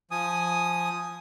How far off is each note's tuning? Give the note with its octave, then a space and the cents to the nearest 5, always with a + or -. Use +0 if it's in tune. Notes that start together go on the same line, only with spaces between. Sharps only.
F3 +0 G#5 +0 D#6 +0